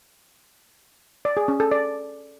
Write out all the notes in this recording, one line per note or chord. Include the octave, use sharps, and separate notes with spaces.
D5
G#4
C#4
A4
D5